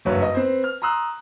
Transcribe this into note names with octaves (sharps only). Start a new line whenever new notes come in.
F#1 G2 F#3 B4 C#5
D#5
C4 B4 C5
F6
A#5 C6 D#6 E6 F#6